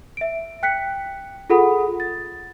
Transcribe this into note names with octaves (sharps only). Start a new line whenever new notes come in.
E5 D7
G5 F#6 B6 C#7
F4 G#4 A4 F#5 B5 D#6
A6